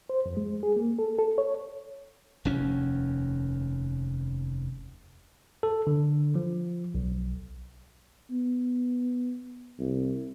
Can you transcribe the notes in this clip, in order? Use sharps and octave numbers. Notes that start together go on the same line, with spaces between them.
C5
F2
G#3
G#4
A#3
A4
A4
C#5
F1 D#2 C#4
A4
D3
F3
B1
B3
C2